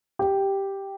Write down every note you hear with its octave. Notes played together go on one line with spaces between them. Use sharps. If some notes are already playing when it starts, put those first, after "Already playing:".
G4